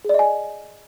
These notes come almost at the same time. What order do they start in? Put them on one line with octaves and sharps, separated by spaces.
G#4 D5 D#5 G#5